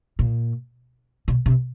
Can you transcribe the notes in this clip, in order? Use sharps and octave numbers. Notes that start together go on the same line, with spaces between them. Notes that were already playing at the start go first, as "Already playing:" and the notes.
A#2
B2
C3